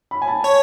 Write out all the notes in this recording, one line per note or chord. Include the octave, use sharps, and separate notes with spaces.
B5
G#5
A5
C#5